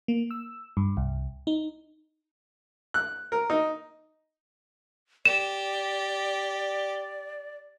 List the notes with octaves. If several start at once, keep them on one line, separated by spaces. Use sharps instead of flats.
A#3
E6
G2
C2
D#4
F#6
A#4
D#4
G4 D5 E7